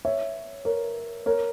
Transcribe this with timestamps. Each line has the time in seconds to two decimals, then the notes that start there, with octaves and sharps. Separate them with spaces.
0.05 C#5 E5
0.65 A#4 C#5
1.26 A#4 C#5